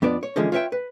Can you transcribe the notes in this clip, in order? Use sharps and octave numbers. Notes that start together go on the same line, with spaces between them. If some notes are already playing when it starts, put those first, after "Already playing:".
F2 B3 D4 D5
C#5
D3 E3 F3 G#3 C#4 G#4
F4 B4 C#5 E5 F5 G5
B4